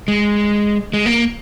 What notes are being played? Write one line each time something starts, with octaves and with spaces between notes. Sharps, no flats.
G#3
G#3
A#3